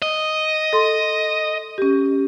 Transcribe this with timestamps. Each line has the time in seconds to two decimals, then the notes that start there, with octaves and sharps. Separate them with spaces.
0.02 D#5
0.73 A4 C6
1.78 C#4 G4